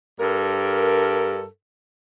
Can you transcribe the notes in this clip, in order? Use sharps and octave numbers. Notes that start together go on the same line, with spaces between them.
G2 A4 A#4